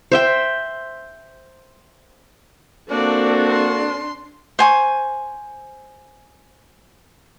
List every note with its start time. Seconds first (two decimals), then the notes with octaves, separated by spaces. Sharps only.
0.12 C5 E5 G5
2.90 A#3 C4 D4 F#4 A4 D5
3.46 C6
4.59 C5 G#5 C#6